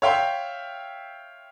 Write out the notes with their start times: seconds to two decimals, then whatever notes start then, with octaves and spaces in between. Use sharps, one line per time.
0.02 C#5 E5 F5 G5 C6